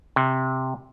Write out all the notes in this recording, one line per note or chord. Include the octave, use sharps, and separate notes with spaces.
C3